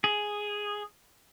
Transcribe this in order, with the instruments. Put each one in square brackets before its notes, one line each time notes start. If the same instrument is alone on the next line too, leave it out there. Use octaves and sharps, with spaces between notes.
[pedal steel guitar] G#4